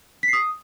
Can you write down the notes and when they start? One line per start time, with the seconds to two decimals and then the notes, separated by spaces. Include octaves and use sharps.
0.23 B6
0.28 C7
0.33 D#6